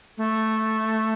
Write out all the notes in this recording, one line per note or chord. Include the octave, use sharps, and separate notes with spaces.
A3